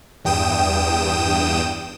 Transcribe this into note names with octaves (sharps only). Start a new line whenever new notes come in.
E2 G2 G5 D#6 E7